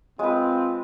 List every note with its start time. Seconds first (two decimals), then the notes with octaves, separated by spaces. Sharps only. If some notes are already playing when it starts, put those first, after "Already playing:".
0.19 G#3 C4 F4 B4